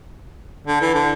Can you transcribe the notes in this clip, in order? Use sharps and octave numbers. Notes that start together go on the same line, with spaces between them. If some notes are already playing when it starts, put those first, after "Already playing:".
D3
E3
D3